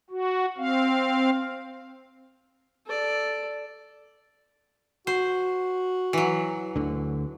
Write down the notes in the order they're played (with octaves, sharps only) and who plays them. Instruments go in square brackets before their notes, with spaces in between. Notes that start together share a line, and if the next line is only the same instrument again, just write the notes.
[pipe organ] F#4
C4 F5
[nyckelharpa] A4 D5
[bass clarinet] F#4 [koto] C5
[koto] E3 F#3
[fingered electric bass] D2 D3